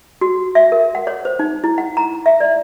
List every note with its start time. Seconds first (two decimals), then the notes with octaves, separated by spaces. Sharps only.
0.21 F#4
0.55 E5
0.72 A#4
0.95 F#5
1.07 C#5
1.25 C5
1.39 D#4
1.64 E4
1.78 F#5
1.97 A#5
2.26 E5
2.40 D5